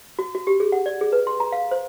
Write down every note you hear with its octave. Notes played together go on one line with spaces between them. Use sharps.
F#4
F#4
G4
G#4
F#5
D5
G#4
B4
C6
A#5
F5
C5